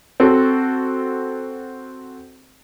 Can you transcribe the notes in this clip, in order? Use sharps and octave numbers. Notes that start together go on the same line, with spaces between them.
C4 F#4 A4